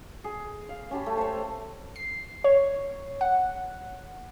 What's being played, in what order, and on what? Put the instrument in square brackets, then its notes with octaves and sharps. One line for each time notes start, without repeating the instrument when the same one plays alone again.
[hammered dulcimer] G#4
F5
C#4 G4 A5 B5
A3
C5 C#5
[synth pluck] C7
C#5
F#5